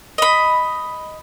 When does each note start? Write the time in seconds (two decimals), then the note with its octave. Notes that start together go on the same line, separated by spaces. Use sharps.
0.18 D#5 B5